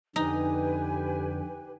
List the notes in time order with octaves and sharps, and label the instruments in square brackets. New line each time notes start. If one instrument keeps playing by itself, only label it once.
[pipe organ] F2 D3 [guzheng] D#4 [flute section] G4 B4 G#5